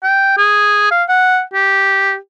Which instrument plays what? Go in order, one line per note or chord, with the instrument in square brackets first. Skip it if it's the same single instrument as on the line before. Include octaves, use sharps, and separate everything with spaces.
[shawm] G5
G#4
F5
F#5
G4